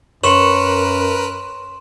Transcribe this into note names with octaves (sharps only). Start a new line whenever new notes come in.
F#2 A#4 B4 C#5 C6 E7 F#7